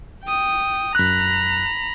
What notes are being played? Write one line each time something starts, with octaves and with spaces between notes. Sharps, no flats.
G5 D#6
F#2 A#5 B5 F#6